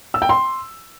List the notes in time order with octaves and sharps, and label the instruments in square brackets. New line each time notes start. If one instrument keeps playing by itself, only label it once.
[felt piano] E6
G5
C6